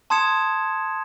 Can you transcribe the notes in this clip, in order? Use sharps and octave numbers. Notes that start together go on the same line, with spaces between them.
A5 C6 D#6 G#6 C#7 E7